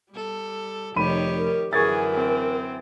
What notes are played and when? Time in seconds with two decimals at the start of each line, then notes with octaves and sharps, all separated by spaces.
0.12 G3 A4
0.96 F1 D#3 G4 C#5 B5 D#7
1.38 A#4
1.73 F#2 D3 E3 G#4 A#4 C#6 G#6 A6
2.14 C4